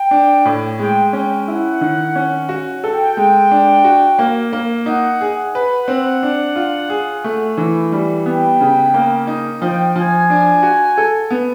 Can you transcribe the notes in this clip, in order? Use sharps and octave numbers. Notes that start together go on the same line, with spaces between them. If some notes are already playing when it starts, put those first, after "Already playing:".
Already playing: G5
D4
A2
G#3 G5
C#4 G5
E4 F#5
D#3
C#4
F#4
A4 G5
G#3
D4
F#4
A#3
A#3
D#4 F#5
G#4
B4 F#5
C4
D4
F4
G#4
A3
E3
G3
B3 G5
C#3
A#3
D#4
F3 G5
F3 G#5
D4
F#4
A4
B3